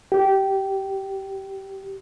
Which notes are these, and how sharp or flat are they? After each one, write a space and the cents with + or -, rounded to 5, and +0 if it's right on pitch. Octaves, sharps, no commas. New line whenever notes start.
G4 -15